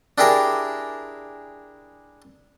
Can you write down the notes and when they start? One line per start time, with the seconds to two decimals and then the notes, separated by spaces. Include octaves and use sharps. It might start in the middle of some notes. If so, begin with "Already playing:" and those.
0.18 D4 E4 G4 G#4 A#4